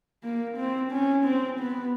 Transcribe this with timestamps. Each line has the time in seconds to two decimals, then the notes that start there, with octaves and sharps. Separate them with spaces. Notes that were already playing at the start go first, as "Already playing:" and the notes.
0.24 A#3
0.57 C4
0.92 C#4
1.25 C4
1.60 B3